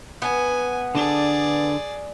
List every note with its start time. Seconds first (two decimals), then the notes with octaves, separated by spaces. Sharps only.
0.22 B3 G#5
0.95 D3 D4 G#4 A4 D5